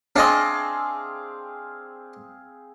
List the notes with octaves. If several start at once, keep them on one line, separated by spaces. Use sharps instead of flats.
C4 D4 G#4 D#5 F5